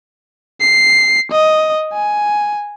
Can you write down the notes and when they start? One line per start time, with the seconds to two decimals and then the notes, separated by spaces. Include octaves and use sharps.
0.61 C7
1.32 D#5
1.94 G#5